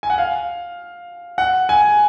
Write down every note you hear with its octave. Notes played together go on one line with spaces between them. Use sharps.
G#5
F#5
F5
F#5
G#5